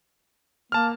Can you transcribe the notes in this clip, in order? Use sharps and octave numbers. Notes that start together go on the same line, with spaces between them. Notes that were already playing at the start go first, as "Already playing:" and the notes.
A#3 A5 F6